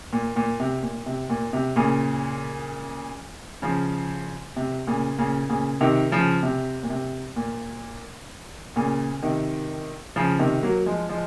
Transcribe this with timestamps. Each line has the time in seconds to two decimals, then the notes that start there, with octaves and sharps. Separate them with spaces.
0.13 A#2
0.36 A#2
0.60 C3
0.83 A#2
1.06 C3
1.30 A#2
1.53 C3
1.76 A#2 C#3
3.62 C#3 F3
4.56 C3
4.87 A#2 C#3
5.18 A#2 C#3
5.49 A#2 C#3
5.81 C3 D#3
6.12 C#3 F3
6.43 C3
6.83 A#2
6.90 C3
7.36 A#2
8.76 A#2 C#3
9.23 C3 D#3
10.16 C#3 F3
10.39 C3 D#3
10.63 F#3 A#3
10.86 F3 G#3
11.09 F3 G#3